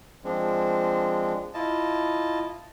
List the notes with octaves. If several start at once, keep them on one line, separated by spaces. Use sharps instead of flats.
F3 G#3 C4 D4
E4 F4 D#5 A5